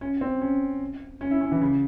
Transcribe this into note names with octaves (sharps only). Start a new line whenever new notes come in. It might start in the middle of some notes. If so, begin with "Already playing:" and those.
C#4
C4
C#4
C#4
E4
C#4
E3
C#3